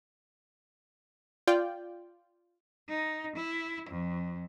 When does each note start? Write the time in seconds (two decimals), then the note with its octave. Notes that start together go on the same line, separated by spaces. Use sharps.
1.47 F4 D5 G5
2.89 D#4
3.35 E4
3.90 F2